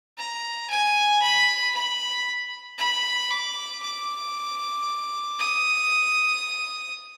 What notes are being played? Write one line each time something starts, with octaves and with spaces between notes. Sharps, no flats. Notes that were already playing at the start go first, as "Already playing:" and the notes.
A#5
G#5
B5
B5
B5
D6
D6
D#6